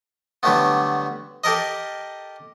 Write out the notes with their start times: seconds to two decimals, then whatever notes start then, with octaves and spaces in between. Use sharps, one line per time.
0.43 D3 F#3 G3 A3 B3
1.44 G4 A4 A#4 D#5